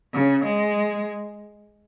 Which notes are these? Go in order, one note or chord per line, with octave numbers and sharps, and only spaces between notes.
C#3
G#3